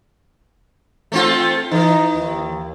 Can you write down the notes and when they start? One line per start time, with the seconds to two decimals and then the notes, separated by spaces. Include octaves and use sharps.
1.12 A3 C4 F4
1.72 E3 D#4
2.14 D#2